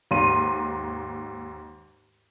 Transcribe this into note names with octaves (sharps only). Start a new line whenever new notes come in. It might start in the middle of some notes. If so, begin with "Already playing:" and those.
D#2 G#2 C6 D#7